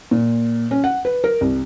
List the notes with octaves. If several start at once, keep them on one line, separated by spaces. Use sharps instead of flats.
A#2
C#4
F#5
B4
A#4
C2